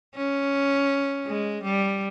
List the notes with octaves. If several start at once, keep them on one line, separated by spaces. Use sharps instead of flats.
C#4
G#3
G3